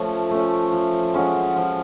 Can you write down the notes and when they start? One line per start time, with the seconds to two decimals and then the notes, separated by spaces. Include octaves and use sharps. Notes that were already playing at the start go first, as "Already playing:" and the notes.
Already playing: F3 A3 C#4
0.31 A3 C#4
0.72 F3
1.14 G#3 C#4 F#4
1.56 F3